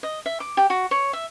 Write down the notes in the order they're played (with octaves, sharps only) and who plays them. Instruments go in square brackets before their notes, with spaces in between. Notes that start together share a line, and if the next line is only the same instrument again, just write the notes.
[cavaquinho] D#5
E5
D6
G4
F#4
C#5
E5